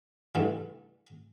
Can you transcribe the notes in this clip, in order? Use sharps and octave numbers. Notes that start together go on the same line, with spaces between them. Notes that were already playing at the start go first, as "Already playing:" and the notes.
G2 E3 A3